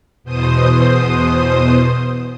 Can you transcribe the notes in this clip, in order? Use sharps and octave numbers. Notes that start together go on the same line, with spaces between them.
E2 B2 C5 D#6